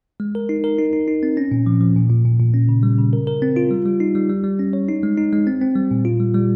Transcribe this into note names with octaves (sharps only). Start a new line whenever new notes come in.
G#3
A#4
D#4
A#4
D#4
D#4
D#4
C4
C#4
A#2
F3
F3
A#2
A#2
A#2
A#2
C#4
C#3
G3
C#3
A#4
A#4
C4
F4
G3
G3
D#4
G3
G3
G3
C#4
C#5
D#4
G#3
D#4
G#3
C4
C4
G3
A#2
F4
G3
G3